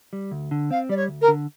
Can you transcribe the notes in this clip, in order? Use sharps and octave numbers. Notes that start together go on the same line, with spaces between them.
G3
D2
D3
C4 F5
G3 D5
C#5
D2
A#4
D3